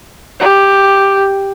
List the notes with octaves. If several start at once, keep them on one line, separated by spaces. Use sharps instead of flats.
G4